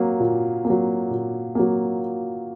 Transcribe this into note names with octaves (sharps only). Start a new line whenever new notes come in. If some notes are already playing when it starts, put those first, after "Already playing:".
Already playing: F#3 A#3
A#2
A#3
F#3
A#2
F#3 A#3